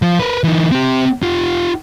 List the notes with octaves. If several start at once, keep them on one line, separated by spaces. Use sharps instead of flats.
F3
A#4 B4
E3 D#4
C4 G4
F4 G4